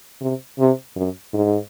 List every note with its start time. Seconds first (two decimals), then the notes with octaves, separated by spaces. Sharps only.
0.21 C3
0.59 C3
0.96 F#2
1.34 G#2